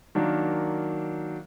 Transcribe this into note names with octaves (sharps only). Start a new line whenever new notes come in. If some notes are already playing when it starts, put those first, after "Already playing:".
D#3 F#3 A#3 D4